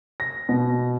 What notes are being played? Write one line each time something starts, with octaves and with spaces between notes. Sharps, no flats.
A#6
B2